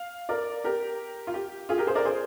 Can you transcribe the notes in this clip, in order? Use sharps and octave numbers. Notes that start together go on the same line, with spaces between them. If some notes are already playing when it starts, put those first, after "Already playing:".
Already playing: F5
A#4 D5
G4 A#4
F4
G4
F4 G#4
G4 A#4
G#4 C5
A#4 D5
G#4 C5